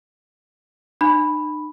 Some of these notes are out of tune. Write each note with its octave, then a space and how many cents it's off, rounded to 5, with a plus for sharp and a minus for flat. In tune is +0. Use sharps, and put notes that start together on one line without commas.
D#4 -45 B5 +0